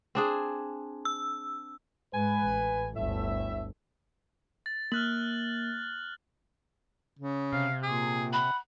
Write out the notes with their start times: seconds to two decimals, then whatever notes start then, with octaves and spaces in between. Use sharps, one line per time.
0.15 C4 D4 G#4
1.05 E6
2.14 G#2 G#3 B4 G#5
2.43 A1
2.95 G1 D2 A2 A3 E5
4.66 A6
4.92 A#3 F6 F#6 F#7
7.19 C#3
7.53 C3 F5
7.83 A#2 G#4
8.33 F#5 B5